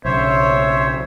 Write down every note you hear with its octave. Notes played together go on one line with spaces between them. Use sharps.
B1 C#3 C5 C#5 E5